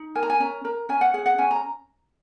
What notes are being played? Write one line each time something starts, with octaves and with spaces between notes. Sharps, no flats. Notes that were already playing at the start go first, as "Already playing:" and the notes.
Already playing: D#4
A#4 G#5
A#5
G#5
C#4 A#5
A#4 A#5
C#4 G#5
F#5
G#4 F#5
F#5
C#4 G#5
A#5